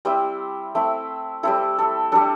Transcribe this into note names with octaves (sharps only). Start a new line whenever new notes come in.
G3 C4 E4 C5
A3 C4 E4
G3 C4 E4 A4
A4
G3 D4 A4